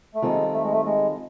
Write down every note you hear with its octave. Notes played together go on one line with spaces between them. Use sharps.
A3
D#3 G3 G#3 C4 F4 A4
A3
G#3
A3
G#3